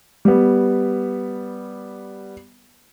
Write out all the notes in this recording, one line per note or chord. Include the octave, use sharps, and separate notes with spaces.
G3 B3